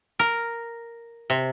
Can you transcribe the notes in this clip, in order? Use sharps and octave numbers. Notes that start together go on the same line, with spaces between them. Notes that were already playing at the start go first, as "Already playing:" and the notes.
A#4
C3